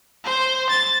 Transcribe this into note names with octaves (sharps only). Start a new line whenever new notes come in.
C5
A6